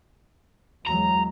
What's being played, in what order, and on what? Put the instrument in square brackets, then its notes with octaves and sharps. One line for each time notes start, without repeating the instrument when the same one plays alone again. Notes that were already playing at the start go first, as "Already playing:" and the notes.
[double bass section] E2 F#3 G#3 [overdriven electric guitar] A#5